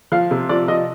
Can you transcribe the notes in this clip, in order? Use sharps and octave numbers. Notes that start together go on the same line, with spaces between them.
F3 F5
C3
F3 D5
F3 D#5